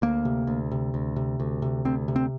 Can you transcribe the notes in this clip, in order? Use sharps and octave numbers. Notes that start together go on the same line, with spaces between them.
D2 A#3
C3
D2
C3
D2
C3
D2
C3
D2 C4
C3
C4